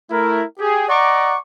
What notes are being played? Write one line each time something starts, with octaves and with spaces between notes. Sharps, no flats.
A3 E4 A#4
G4 G#4
D5 D#5 F#5 A#5 C#6 D6